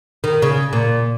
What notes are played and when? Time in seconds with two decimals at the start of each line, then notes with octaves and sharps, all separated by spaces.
0.24 D#3
0.42 C#3
0.73 A#2